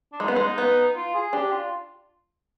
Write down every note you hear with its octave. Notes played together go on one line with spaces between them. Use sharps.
D4
G#3 D#4
B3
G#3
B3
F4
G#4
D4 G4
F4